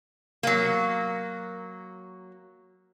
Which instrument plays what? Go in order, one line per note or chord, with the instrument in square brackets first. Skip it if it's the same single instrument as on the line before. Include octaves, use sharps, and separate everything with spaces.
[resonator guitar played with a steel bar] F#3 A#3